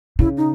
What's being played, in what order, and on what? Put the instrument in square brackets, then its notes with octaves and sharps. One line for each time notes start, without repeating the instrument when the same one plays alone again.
[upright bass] C#3 [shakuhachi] E4
[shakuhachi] D#4